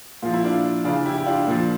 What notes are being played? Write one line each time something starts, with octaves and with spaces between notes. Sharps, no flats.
A#2 F3 F4
E4
D4 F4
C#3 E3 D4 F4
E4 G4
G4
D4 F4
A#2 F3